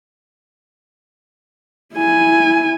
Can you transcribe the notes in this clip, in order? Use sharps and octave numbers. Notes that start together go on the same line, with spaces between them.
E4 G#5